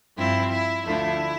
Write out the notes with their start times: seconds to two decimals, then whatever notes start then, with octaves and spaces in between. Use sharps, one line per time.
0.17 G2 F3 C4 E4
0.51 E4
0.86 D2 D3 F3 A3 E4